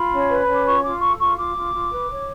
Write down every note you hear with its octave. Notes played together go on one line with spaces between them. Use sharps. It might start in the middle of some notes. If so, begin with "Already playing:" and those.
Already playing: F4 B5
C#4
B4
C#4
D6
F4 C#6
F4 D6
A4 C#6
F4 C#6
F4 D6
F4
F4
B4
C#5